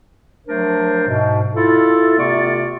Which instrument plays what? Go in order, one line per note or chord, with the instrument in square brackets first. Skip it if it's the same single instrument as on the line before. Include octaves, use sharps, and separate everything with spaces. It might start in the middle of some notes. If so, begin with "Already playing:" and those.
[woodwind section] F3 F#3 A3 D4 A#4 C5
G#2 B2
E4 F4 A4
C3 A3 B3 F4 D5 C#6